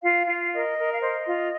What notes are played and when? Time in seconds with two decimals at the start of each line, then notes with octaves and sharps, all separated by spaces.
0.02 F4 F5
0.26 F4
0.52 A#4 D#5
0.77 A#4
0.92 F5
1.01 C5 D#5
1.26 F4